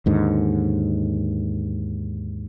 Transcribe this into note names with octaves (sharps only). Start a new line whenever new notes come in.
D#2 G#2 D3